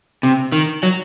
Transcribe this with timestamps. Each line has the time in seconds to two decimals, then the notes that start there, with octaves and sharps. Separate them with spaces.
0.23 C3
0.52 D#3
0.83 F#3